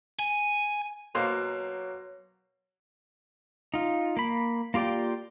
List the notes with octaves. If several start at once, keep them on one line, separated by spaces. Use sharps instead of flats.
G#5
B2 F#3 A#3 C5
D#4 F4
A#3 B5
A#3 F4 G4 D5 G5